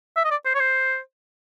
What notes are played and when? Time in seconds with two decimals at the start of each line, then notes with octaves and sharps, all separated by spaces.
0.16 E5
0.25 D#5
0.31 D5
0.45 C5
0.55 C#5
0.60 C5